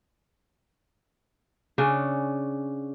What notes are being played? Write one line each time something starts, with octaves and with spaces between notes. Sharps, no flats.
C#3 C#4 D4